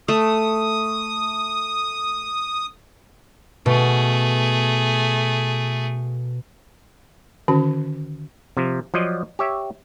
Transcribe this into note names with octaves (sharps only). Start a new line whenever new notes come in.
A3 D#6
B2 A3 G#4
D3 D#3 C#4 F#4 A5
C3 F3
F3 F#3 F4 D5 D#5
G4 C#5 E5